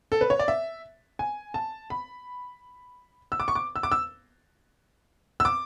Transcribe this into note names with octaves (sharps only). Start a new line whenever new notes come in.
A4
B4
C#5
D5
E5
G#5
A5
B5
E6
D6
C#6
D6
E6
D6
E6
E6
D6